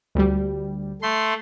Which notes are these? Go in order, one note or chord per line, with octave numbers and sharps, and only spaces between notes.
D2 G3
A3 C6